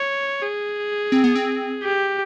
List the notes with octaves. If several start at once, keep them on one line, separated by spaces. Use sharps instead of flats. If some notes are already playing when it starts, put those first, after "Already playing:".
Already playing: C#5
G#4
C4
B3
C4
G4